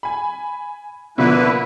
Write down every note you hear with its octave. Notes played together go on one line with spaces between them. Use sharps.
G#5 B5
B2 D3 F3 A#3 E4 B4